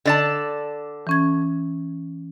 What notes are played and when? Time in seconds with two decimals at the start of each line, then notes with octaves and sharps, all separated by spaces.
0.05 D3 D5 A5
1.07 E3 C#4 G#6